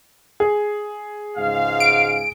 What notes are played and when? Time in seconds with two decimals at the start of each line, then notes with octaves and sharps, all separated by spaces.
0.40 G#4
1.37 C#2 G#2 F5
1.80 D7